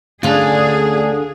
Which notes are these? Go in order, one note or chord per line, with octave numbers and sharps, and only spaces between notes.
D2 D3 C#4 D4 F4 G#4